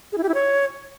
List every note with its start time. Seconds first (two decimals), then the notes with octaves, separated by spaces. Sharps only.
0.12 G#4
0.18 E4
0.23 G4
0.29 E4
0.34 C#5